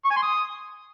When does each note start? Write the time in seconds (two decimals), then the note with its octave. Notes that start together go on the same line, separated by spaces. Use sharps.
0.04 C#6
0.11 G#5
0.17 C6
0.23 D#6